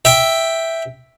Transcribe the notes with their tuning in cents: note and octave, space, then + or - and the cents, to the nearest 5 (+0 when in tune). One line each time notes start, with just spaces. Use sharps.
E5 +0 G5 +0